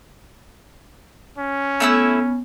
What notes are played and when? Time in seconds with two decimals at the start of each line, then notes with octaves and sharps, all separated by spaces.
1.38 C#4
1.80 A3 B3 E4 E6